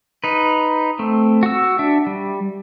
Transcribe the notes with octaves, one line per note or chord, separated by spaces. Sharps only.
D#4 B4
A3 C4
F#4 E6
D4 E5
G3